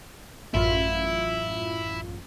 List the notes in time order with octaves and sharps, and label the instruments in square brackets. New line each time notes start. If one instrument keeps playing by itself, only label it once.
[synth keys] A1 F#2 F4 [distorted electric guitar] E4